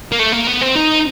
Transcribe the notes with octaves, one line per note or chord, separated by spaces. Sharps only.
A#3
A3
A#3
B3
C4
D#4